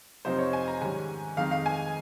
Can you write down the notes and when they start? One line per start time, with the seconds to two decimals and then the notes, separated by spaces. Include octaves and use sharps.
0.25 F2 C3 F3 C4 D#4 C5
0.39 C#5
0.53 G#5
0.68 A#5
0.81 G#2 D#3 G3 C#4 G#5
1.37 F2 D#3 G#3 D#4 F5
1.51 F5
1.66 G#5